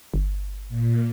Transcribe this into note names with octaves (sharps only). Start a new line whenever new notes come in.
G1
A#2